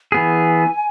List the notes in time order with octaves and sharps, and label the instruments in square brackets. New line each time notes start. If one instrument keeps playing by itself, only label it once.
[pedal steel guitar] E3 B3 G#4 [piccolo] G#5